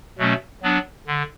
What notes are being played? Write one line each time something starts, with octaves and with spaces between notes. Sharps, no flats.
B2 F#3 A3 C#4
F#3 B3 D4
D3